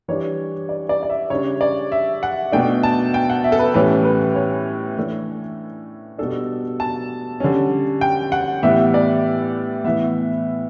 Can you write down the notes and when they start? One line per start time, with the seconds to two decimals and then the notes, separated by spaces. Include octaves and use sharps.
0.08 E3 G3 D4 C#5
0.69 D5
0.89 D5
1.03 D5
1.10 E5
1.30 C#3 G3 D4 C#5
1.61 D5
1.92 E5
2.23 F#5
2.52 B2 A3 D4 G5
2.83 A5
3.14 G5
3.30 F#5
3.44 E5
3.52 A4
3.59 B4
3.74 A2 E3 G3 C#4 B4
4.05 B4
4.35 C#5
4.97 E3 A3 D4
6.19 B2 G3 D4 A4
6.80 A5
7.40 D3 G3 C#4
8.01 G5
8.32 F#5
8.63 A2 E3 G3 B3 E5
8.94 D5
9.84 A2 E3 B3 E5